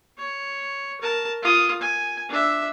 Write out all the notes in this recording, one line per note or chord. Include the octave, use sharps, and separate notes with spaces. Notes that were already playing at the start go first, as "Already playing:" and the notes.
C#5
A#4 A5
F4 D#6
G#5
D4 E5